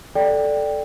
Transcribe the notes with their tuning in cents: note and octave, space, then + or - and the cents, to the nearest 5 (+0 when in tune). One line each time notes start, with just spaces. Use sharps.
A4 +0 D5 +0 G5 +0